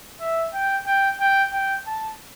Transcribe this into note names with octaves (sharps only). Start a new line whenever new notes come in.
E5
G5
G5
G5
G5
A5